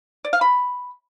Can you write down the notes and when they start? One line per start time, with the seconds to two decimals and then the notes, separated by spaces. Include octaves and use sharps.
0.25 D5
0.33 F5
0.41 B5